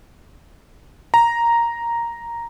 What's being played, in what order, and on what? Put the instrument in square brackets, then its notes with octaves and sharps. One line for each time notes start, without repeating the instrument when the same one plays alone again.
[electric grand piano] A#5